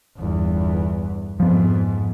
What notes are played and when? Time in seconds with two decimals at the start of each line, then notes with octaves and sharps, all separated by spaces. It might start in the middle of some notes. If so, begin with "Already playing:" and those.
0.17 G1 E2
1.40 F2 G#2 F3 B3